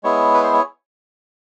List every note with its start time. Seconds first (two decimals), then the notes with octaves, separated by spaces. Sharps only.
0.03 G#3 B3 E4 G#4 C#5
0.34 B4
0.43 C5
0.54 C#5